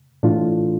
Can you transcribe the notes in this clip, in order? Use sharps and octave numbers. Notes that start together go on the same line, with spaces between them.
A2 E3 A3 D4 F4